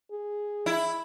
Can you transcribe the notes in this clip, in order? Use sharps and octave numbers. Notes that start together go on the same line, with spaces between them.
G#4
E4